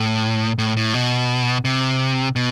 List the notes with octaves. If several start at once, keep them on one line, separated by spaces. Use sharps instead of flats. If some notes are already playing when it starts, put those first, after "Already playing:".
Already playing: A2
A2
A2
B2
C3
B2